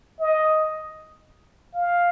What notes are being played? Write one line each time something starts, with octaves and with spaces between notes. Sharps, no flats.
D#5
F5